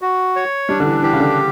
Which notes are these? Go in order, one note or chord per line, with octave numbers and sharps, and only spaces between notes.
F#4
C#5
G3 D4
D3
E3
E3 G4
C#3
D3